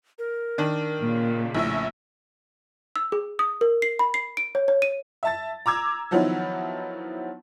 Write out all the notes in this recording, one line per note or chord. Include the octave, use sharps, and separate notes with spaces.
A#4
D#3 D4
A#2 C#3
A#1 A2 E5
E6
G#4
D#6
A#4
C7
B5
C7
D7
C#5
C#5
D#7
E5 A5 A6
A#5 D6 E6 G#6
D#3 F3 F#3 B3 D#4 E4